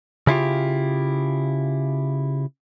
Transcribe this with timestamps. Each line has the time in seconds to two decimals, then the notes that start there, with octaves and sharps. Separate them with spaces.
0.27 C#3 E4 F4 G4